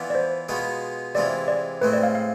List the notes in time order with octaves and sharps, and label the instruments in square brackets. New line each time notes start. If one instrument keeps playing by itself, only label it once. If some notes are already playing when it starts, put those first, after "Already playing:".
Already playing: [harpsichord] E3 B3 D4 F4
[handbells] D5
C5
[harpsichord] B2 G#3 B3 F4
[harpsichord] C3 E3 G#3 D4 F4 [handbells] D5
[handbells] D5
[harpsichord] A2 G#3 C4 [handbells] B4
[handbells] D5
F5
F5